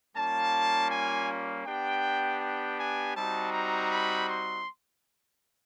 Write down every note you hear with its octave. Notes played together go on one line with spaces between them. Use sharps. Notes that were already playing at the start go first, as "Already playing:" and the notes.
G3 A#3 C#4 F4 A5
G#5
B3 D4 G4 G5
G5
G#5
G3 C4 D#4 F#4 A5
A#5
B5
C6